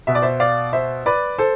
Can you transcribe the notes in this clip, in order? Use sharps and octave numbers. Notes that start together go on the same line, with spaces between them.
B2 E5
D5
C5 E5
D5 F5
C5 E5
B4 D5
A4 C5